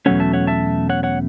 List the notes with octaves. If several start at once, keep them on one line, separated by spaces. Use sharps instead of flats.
E2 B2 F#3 A3 C#4 C#5 F#5
E5 A5
C#5 F#5
E5 A5
C#5 F#5
C#5 F#5